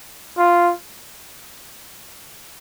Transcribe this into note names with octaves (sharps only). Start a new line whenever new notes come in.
F4